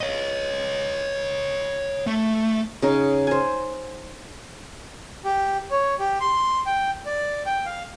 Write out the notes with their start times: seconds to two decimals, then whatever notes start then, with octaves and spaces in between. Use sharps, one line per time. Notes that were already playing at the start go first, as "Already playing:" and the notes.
0.01 C#5 D#5
2.07 A3
2.82 C#3 D#4
3.27 C5 G#5
5.25 G4
5.71 C#5
5.99 G4
6.21 C6
6.66 G5
7.06 D5
7.46 G5
7.66 F5